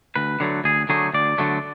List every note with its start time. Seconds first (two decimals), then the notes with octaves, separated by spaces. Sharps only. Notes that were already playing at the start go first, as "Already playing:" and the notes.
0.16 D2 B4
0.40 D3 F#3 A3
0.64 D2 G#4
0.89 D3 F#3 A3 G#4
1.13 D2 D5
1.38 D3 F#3 A3